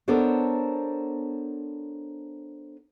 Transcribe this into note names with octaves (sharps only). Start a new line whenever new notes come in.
B3 D4 A4 A#4 C5 C#5